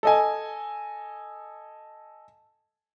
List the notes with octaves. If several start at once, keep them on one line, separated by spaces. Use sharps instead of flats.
A4 D#5 G#5